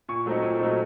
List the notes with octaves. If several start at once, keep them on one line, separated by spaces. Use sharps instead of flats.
A#2 C#6
F#3 A3 C4 D#4
A#2
F#3 A3 C4 D#4